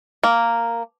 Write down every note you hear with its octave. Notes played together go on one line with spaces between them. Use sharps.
A#3